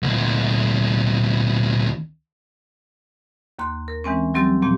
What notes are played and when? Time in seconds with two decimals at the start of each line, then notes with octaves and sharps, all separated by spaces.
0.03 D2 A#2
3.59 D#2 A#3 C6 F#6
3.88 A#4
4.04 E3 G#3 C4 C#4
4.34 F#3 G3 C4 G4 E6 A6
4.62 A#2 F3 A#3 C4 G4